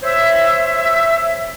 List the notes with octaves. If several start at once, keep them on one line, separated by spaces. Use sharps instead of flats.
C5 C#5 E5